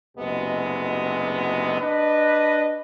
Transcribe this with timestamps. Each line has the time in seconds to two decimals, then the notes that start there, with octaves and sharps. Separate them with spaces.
0.18 F#1 D2 C3 G#3 B3 D#5
1.80 D4 B4 D#5